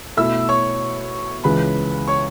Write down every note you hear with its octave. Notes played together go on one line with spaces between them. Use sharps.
B2 A3 E4 E5 E6
C#5 C#6
C#2 C#3 E3 B4 B5
C#5 C#6